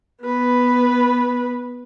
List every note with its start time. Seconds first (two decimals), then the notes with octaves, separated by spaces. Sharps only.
0.24 B3 B4